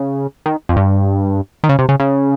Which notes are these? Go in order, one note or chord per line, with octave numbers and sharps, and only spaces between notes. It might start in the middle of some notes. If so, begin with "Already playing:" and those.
Already playing: C#3
D#3
F2
G2
D#3
C#3
C3
C#3
C#3